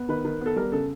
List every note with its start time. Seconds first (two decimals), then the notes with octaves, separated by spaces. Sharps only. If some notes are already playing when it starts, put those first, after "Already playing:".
Already playing: B3
0.09 D#3 B4
0.25 D#3
0.41 B3 A4
0.56 G3 A#4
0.72 C#3 A4